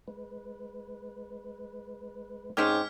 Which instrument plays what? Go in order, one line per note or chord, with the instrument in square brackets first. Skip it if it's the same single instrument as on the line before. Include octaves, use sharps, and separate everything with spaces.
[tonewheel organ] G#3 B4
[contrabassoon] G#2 [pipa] C4 C#4 G4 [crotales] F6 G#6 B6